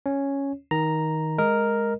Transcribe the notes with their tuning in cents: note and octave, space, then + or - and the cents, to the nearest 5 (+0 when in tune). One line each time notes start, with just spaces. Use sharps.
C#4 +0 C#5 +0
D#3 +15 A#5 +0
G#3 +0 A#4 +0 D#5 +0